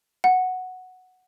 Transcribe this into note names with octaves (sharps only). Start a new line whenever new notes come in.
F#5